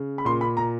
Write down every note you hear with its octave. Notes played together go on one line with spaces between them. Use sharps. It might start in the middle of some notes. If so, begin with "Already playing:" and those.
Already playing: C#3
B5
A#2 C6
B5
A#2 A#5